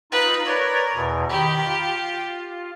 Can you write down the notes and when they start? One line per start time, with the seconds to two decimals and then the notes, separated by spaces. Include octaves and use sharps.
0.12 D#4 F4 B4
0.45 A#4 B4 C#5 D5
0.95 E2 B2
1.30 D#3 G4 B5
1.65 F4